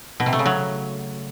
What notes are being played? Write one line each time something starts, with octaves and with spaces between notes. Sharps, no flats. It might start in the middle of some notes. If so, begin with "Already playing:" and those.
B2
C3
A3
C#3
F#3